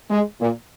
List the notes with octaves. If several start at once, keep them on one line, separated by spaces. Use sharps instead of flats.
G#3
A#2